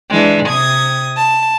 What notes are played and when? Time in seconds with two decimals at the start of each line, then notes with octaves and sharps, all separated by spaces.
0.11 E3 G#3 D4
0.47 C3 D#6 G#6
1.16 A5